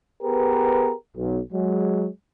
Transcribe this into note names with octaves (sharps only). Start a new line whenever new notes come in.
B3 G4 G#4 A#4 B4
B1
F#3 G#3